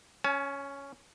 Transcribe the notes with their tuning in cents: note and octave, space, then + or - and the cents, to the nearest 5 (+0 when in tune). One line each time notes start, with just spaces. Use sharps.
C#4 +0 G#5 +40